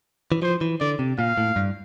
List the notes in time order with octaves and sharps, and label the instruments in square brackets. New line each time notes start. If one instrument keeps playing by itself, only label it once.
[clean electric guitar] E3
[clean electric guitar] F3 [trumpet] C5
[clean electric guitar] E3
[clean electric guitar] D3 [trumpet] D5
[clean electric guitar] C3
[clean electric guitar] A#2 [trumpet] F5
[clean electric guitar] A2
G2